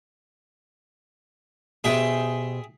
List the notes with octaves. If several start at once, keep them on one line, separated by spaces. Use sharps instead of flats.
B2 G4 G#4 C5 E5 G5